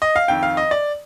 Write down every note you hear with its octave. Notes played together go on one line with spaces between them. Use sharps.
D#5
F5
F2 D#3 G5
F5
D#5
D5